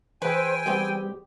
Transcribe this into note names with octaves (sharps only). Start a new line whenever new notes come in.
E3 G#4 B4 C5 G5 G#5 E6
G3 B3 C4 G4